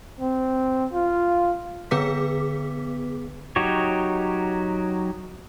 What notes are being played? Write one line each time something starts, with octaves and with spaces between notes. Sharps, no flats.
C4
F4
D3 B3 G#4 B4 D6 B6
F#3 D#4 F#4 G4 C#5